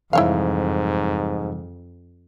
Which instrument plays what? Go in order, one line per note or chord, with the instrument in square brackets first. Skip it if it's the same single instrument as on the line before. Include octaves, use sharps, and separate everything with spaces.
[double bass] F2 [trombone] G#2 [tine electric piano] C3 E3 G3 [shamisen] E4 C#5 F5